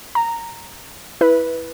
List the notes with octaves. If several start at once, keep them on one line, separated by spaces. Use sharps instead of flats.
A#5
E4 B4